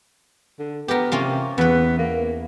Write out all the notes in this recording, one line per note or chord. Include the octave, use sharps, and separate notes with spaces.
D3
B3 G4 A#4
C3 A#3 C#4 F4
E2 B3 B4
A#3